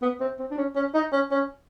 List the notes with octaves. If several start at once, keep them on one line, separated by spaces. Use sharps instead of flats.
B3
C4
C4
D4
C#4
C#4
D#4
C#4
C#4